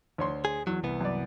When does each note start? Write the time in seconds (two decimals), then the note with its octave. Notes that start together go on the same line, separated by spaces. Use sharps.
0.18 D2 C#5 C6
0.45 G#4
0.67 E2 F#3
0.84 C2 E3 B3
1.01 F#2 D5